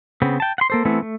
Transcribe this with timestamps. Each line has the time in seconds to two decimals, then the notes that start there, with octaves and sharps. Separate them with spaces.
0.22 C#3 B3 C4
0.40 G5 A5
0.58 F#5 C6
0.70 A#3 A4 C5
0.85 E3 A3 B3 C4 E4
1.02 A3